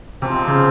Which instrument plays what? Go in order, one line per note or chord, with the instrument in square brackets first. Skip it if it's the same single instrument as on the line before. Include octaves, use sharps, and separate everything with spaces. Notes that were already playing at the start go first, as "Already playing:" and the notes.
[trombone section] G#2 F3 C4 [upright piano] C3
[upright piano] C#3